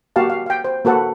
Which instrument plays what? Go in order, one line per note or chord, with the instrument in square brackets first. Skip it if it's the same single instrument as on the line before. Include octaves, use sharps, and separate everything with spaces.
[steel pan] A#3 F#4 G4 F5 A5
F5
F5 G5
C5
A#3 F#4 A4 B4 F#5